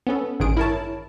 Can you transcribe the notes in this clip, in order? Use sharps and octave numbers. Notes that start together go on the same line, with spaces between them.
B3 C#4 A4
A1 G2 D#3 G#4 D7
E4 A#4 C#5 A5